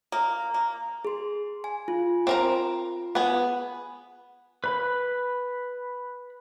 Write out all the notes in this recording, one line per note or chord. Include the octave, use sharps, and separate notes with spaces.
A#3
A#3
G#4 C6
G#5
F4
C4 A#4 A#5
B3 G#4
B4 B5